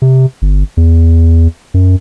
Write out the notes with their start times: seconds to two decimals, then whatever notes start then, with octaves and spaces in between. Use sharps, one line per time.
0.02 C3
0.42 G1
0.77 E2
1.74 F#2